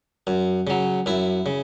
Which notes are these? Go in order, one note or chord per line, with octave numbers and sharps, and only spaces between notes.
F#2
C#3 F#3
F#2 E4
C#3